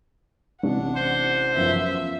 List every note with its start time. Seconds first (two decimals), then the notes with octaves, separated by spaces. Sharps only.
0.63 A1 C3 D4 F#5
0.95 C5
1.55 F#2 F3 B3 E5